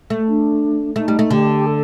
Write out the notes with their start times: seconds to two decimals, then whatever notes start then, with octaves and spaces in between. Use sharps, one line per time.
0.10 A3
0.28 D4
0.96 A3 D#4
1.08 G3
1.19 A3
1.30 D3 G4
1.66 A4